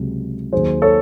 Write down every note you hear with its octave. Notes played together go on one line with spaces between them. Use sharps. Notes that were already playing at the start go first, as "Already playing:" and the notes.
Already playing: C#2 C3 F#3
D#2 D#3 F#3 G#4 C5
A4 C#5